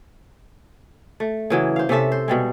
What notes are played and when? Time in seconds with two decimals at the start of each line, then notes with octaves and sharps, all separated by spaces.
1.20 A3
1.50 C#3 E3 F#3
1.76 C5 F5
1.89 C3 C#4 A4 E5
2.12 C5
2.28 B2 G3 G#3